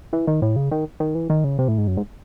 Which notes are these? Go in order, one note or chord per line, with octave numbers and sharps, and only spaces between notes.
E3
D#3
A2
C#3
D#3
D#3
E3
D#3
C#3
C3
A2
G#2
F#2
G#2